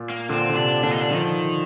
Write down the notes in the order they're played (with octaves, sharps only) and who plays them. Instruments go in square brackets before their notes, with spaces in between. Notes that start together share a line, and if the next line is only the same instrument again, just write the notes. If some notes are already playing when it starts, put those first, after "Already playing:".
Already playing: [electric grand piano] A#2
[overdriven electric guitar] A#3
[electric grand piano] A#2 D3 [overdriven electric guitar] C4
[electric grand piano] D3
[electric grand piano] C3 [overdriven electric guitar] D4
[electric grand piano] A#2 D3 [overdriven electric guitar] D4
[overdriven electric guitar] D#4
D4
[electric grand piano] D3 F3 [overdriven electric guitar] D#3